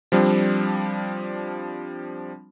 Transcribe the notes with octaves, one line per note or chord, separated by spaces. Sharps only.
F3 G3 C4 D4